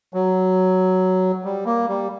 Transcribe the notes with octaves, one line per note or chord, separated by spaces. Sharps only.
F#3
G3
A#3
G3